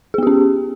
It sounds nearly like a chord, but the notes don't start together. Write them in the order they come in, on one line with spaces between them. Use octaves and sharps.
G#4 B3 G4 C#4